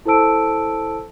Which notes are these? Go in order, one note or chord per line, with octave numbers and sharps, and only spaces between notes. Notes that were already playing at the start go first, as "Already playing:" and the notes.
E4 A4 C5 A5 E6 D7